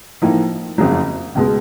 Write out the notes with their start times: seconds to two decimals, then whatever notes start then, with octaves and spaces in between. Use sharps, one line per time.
0.22 A2 F3 A#3 D#4
0.78 F#1 F2 C#3 F#3
1.35 C#2 B2 G#3